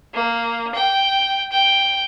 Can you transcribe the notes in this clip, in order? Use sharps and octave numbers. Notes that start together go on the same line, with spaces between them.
A#3
G5
G5